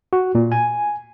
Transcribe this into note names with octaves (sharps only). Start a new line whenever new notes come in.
F#4
A#2
G#5